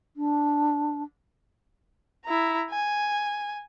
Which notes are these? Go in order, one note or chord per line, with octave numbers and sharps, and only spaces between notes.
D4
E4 A#5
G#5